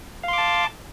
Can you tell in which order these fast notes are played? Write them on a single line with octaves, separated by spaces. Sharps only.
F5 C6 D6 A5